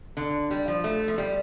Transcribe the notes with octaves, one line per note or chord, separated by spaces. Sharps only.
D3
G3
F3
A3
F3
G3